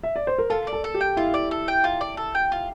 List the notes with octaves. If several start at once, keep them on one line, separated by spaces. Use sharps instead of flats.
E5
D5
C5
A#4
F4 A4
D5
A4
A4
G4
G5
E4 F4
D5
A4
G5
F4
D5
A4
G5
F4